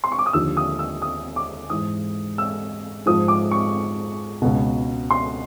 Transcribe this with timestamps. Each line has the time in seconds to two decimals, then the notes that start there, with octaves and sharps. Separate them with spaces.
0.04 C6
0.12 C#6
0.19 D6
0.26 D#6
0.33 D#2 D3 F3 E6
0.57 D#6
0.79 E6
1.02 D#6
1.36 D6
1.70 G#2 E3 D#6
2.38 E6
3.06 G#2 F3 D#6
3.28 D6
3.51 C#6
4.42 C#2 B2
5.10 C6